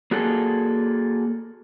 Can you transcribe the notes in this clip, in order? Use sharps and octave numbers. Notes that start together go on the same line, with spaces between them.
A#3 F#4 G#4 A4